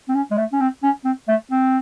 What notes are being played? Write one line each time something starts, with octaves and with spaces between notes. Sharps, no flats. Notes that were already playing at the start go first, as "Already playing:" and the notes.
C4
C#4
G#3
A3
C#4
C4
C#4
C4
A3
C4